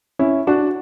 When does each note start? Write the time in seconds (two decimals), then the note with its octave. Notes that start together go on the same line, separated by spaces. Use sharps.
0.19 C#4 E4
0.47 D4 F#4